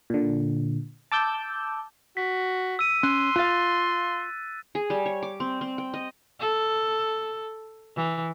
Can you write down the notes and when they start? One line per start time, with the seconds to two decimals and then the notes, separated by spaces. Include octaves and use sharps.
0.10 A#2 D3
1.12 A5 D6 E6 G6
2.17 F#4 B6
2.79 E6 D#7
3.03 C#4 C6 F#6
3.36 F4 F5 F#6 A6
4.75 G#4
4.90 G3
5.06 C#5
5.23 D6
5.40 C4
5.61 C4
5.78 G5
5.94 D#5
6.40 A4
7.96 E3